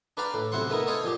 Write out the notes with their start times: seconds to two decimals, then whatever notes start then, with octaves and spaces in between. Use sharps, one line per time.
0.17 D4 B4 D5 F5 G5 A#5
0.34 A2
0.52 B1 C3 E4 C5 F#5 C6
0.70 A3 B3 D#4 E4 A#4
0.87 A4 C5 C#5 D#5 F5
1.04 A#2 F3 G4